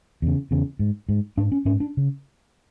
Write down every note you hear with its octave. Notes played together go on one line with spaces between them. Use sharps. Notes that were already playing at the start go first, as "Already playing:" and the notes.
E2 C#3
E2 C#3
G#2
G#2
G#2 D4
C#4
G#2 C#4
D4
C#3